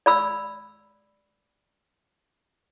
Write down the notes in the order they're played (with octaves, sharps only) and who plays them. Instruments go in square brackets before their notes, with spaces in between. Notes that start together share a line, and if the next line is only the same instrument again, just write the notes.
[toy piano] D5 B5 E6